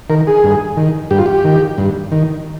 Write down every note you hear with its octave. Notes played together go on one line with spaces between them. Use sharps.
D#3 A#4
G#4
G2
D#3
G2 G4
F4
G4
D#3
G2
D#3